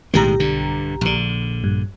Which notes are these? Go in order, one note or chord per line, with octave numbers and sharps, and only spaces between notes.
B1 A2 D#3 G#3 G4 A#5
G2 D3
A#1 D3
G2